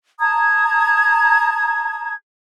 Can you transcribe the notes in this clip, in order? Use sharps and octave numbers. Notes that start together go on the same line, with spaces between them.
A5 A#5 D#6 G#6